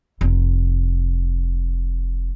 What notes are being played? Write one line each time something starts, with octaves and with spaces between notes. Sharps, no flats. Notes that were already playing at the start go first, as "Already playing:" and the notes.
F1 D#4